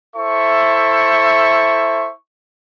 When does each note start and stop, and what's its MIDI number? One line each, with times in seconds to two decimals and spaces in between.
0.15 2.10 64
0.15 2.10 69
0.15 2.10 72
0.15 2.10 76
0.15 2.10 85